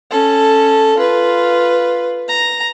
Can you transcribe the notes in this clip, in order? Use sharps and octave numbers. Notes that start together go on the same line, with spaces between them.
C#4 A4
F4 B4
A#5